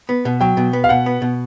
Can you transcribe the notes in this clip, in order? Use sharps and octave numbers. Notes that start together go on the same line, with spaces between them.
B3
B2
F#3 G5
B2
B3
F5
B2 F#5
B3
B2